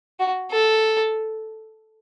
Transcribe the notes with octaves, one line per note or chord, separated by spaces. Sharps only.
F#4
A4